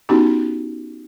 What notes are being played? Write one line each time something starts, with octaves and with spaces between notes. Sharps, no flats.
B3 C#4 D#4 E4 F#4 G4